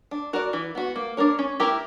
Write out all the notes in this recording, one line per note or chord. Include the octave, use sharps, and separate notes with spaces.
D4
F#4 A#4 D5
E3
B3 F#4
A#3
D4 A#4 C#5
C#4
E4 G4 A#4